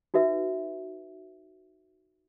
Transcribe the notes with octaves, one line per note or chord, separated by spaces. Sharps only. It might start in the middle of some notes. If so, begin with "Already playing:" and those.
D#4 F#4 B4 E5